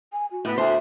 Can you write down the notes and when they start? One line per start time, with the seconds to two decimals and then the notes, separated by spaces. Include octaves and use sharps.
0.13 G#5
0.32 F#4
0.45 A2 B3
0.58 D2 C5 E5